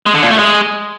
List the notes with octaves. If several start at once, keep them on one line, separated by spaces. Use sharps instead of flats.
G#3
D3
A#2
A3
G#3